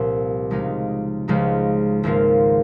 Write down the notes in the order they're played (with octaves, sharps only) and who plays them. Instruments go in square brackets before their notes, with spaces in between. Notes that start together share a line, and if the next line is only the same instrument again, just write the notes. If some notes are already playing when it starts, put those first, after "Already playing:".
Already playing: [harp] C2 A#2 F3
C#2 C#3 F3 G#3 D#4
C#2 C#3 F3 G#3 D#4
G#1 G#2 F3 A#3 F4